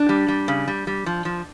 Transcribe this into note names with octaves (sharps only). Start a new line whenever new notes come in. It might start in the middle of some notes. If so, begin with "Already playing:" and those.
Already playing: D4
G3
G3
C#3
G3
G3
F3
F3